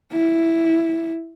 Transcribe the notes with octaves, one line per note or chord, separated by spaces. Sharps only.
E4